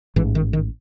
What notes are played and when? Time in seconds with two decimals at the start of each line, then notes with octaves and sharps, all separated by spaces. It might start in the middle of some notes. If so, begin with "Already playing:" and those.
0.16 A1 G#2 E3
0.35 D#3
0.53 D#3